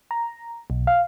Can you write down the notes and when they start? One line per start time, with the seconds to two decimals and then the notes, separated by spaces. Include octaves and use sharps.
0.11 A#5
0.70 B1
0.87 F5